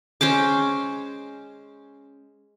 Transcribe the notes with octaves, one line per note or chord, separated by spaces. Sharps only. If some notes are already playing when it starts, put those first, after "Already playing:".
G#3 C#4 C5 D6